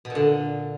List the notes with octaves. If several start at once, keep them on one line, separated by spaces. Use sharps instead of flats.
B2
A#2
D3